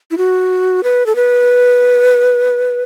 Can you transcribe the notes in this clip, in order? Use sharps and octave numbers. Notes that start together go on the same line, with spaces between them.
E4
F#4
B4
A4
B4